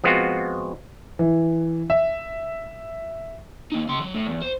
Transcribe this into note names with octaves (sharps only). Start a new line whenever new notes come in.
F3 G#3 B3 C4 F4 F#4
E3
E5
A#3 D#4
C#3 C6
F#3
A2
E2
C5